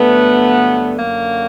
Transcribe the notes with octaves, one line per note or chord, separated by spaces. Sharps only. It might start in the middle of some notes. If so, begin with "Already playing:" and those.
Already playing: G2 D3 F#3 A3 B3
F#2 D3 F#3 A#3